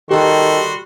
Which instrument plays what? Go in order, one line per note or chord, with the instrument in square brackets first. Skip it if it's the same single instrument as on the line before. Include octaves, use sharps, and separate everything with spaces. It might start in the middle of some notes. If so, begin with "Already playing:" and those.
[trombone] D#3 [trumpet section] G3 F#4 C6 [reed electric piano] G4 [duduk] A4